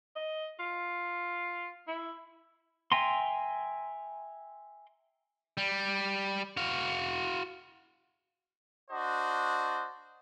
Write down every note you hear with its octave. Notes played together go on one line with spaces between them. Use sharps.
D#5
F4
E4
E5 G5 G#5 A#5 C6
G3
F#4 F5
D4 F#4 C5 D#5